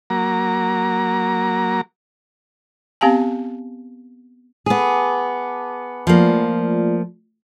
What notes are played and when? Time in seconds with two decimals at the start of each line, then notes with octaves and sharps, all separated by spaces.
0.10 F#3 A#3 A#5
3.01 B3 C4 G4 F5 G#5 A5
4.66 B3 G#4 A5 D6
6.07 F3 A3 A#3 F4 D5